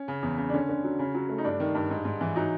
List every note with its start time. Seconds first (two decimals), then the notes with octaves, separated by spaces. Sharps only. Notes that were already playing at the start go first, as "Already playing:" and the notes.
Already playing: C#4
0.08 C#3
0.23 E2
0.38 C#3
0.49 D4
0.54 D3 C#4
0.69 D3
0.84 F#3
0.99 C#3
1.15 F#3
1.29 A3
1.38 D#4
1.44 G2 D4
1.60 D#3
1.75 G2
1.90 G#2
2.05 G#2
2.21 E3
2.36 F#3 D#4